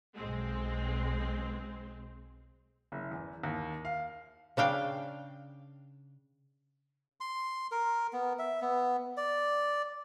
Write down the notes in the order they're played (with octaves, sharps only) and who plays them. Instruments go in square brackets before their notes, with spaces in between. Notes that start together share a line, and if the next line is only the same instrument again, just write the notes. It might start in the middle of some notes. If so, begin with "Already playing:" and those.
[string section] B1 G#3 C4
[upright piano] F#1
E2
D#2
F5
[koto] C#3 D4 F5 G5
[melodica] C6
A#4
B3
E5
B3
D5